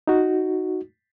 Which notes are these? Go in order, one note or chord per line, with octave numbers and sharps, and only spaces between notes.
D#4 F#4